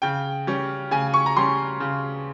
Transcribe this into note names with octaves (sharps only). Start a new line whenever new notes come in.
C#3 G5
G3 C#4
C#3 G#5
C#6
A#5
G3 C#4 C6
C#3